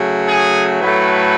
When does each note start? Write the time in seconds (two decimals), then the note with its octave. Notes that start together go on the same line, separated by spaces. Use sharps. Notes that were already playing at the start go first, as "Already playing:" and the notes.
Already playing: C#3 F#3 A3
0.27 G#4
0.82 A2 F#3 A3 B4